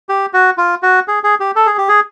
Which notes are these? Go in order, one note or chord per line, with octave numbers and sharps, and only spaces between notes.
G4
F#4
F4
F#4
G#4
G#4
G4
A4
G#4
G4
G#4